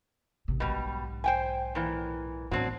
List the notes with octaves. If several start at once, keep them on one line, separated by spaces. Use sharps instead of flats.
G#1 C3
B1 G#2 B2 G3
C5 G5 G#5
A#2 E3
E2 A2 F#3 C4 D4